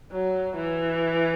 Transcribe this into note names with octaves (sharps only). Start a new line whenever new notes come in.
F#3
E3